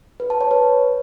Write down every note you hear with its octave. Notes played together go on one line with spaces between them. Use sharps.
B4
A5
C#5
B4